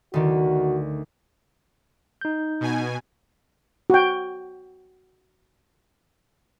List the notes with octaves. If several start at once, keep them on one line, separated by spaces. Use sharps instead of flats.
D2 D#3 F#4
D#4 G6
B2 G#5
F#4 G5